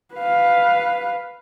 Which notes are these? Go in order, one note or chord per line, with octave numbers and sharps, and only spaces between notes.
B4 F5